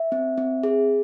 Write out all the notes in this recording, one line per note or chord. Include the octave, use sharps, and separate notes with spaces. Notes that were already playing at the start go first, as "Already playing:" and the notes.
Already playing: E5
C4
C4
G#4